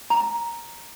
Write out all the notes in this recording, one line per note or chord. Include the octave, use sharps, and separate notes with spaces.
A#5